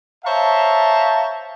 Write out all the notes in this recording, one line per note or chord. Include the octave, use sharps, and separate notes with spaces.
C5 C#5 E5 F5 A5 A#5